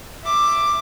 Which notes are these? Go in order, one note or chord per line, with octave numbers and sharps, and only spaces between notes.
E5 D6